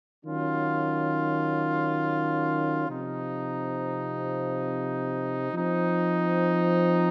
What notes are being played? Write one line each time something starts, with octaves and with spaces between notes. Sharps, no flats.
D#3 F#3 C#4 F4
C3 F3 C4 D#4
F3 C4 D#4